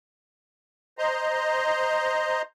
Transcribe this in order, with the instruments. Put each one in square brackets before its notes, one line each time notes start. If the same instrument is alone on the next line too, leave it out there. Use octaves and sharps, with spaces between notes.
[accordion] C5 D#5 A#5 C6